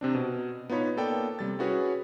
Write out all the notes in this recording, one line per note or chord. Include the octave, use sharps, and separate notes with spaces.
C3 C4 D4
B2
B3 D#4 F4 C#5 B5
A#3 B3 A4 D5 G5
C3 G3 A6
C#4 E4 F#4 G#4 B4 C#5